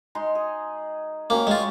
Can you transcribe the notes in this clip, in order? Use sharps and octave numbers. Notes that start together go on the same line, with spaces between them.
G#3 D#4 C6
G#4
F#3 A#3 C#4 G4
G#3 F4